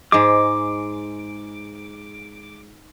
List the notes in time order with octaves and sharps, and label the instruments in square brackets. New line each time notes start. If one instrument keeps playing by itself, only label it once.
[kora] G#2 G#3 [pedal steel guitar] D6